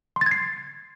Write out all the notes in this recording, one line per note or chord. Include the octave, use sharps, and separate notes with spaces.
C6
A6
G#6
C7